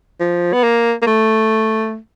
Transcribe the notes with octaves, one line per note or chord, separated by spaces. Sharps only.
F3
B3
A#3
A#3
A3